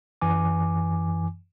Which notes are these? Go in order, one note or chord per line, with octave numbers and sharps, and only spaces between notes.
F#2 E3 G#5 D6